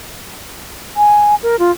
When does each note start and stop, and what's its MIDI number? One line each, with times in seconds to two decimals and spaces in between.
0.96 1.35 80
1.43 1.56 70
1.59 1.71 65